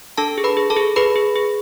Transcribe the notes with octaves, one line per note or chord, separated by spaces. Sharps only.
D4 A4 A5
G#4
B4 B5
G#4
A4 A5
G#4
G#4 B4 B5
G#4
G#4